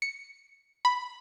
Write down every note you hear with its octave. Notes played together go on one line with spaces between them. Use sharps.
C#7
B5